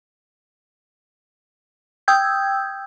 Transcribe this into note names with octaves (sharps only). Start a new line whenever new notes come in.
G5 D#6 E6 G6 G#6